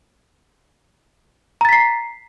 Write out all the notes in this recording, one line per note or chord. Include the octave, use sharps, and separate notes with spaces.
A#5 A6 B6 C7